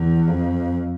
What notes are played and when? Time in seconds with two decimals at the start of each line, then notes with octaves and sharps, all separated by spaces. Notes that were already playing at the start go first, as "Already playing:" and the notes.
Already playing: E2
0.27 F2